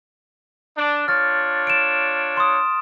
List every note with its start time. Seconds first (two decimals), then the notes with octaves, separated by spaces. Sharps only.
0.77 D4
1.08 D4 F4 C#5 F6 A6
1.67 D7 E7
2.37 C6 D#6